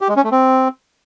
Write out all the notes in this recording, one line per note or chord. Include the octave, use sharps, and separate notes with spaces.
G4
G#3
C#4
A3
C4